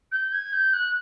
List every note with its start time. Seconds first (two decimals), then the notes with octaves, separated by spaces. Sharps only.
0.11 G6
0.32 G#6
0.52 G6
0.73 F#6